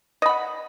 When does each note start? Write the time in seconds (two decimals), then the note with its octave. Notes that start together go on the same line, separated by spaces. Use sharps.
0.22 D#5
0.26 B5
0.29 F#5